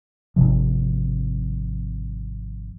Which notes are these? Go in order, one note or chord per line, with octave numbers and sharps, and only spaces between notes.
G#1 C#2 C3 F3